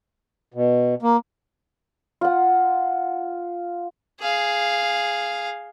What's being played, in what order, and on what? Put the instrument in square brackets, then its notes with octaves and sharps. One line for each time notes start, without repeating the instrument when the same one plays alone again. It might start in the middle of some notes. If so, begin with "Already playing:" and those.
[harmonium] B2
[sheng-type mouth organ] A#3
[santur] F4 F#5
[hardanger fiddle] G#4 F5